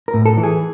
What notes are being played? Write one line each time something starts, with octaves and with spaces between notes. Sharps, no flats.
A#4
A2
A4
E3
G#4